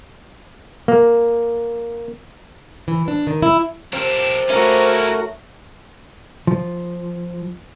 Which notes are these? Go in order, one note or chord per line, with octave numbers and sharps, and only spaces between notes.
A#3
E3
D4
D#3
E4
C3 F3 C4 D4 A#4
A3 C#4 E4 F#4 A#4 C#5 F5
F3